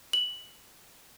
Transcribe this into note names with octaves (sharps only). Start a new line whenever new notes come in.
F#7